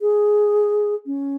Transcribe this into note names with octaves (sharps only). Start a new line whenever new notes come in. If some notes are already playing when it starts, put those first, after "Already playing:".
G#4
C#4